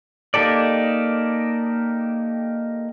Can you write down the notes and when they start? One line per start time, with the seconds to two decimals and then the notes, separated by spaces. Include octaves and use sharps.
0.34 A#3 D#4 G4 A4 D5